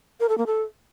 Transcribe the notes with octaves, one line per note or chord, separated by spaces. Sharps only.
A#4
A4
A#3
A4